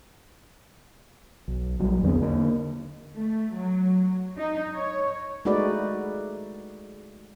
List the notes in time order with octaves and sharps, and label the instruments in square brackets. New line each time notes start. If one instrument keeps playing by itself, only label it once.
[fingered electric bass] B1
A#1 F#3 G3
E2 D3 B3 C4
D3 A#3
[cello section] A3
F#3
D#4
C#5
[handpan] G#3 A3 D#4 F#4 B4 D5